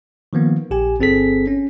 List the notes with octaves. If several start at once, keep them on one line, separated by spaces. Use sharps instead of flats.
D#3 F3 A#3 B3
A#1 G4 G#5
G1 C4 G#4 A4 B6
C#4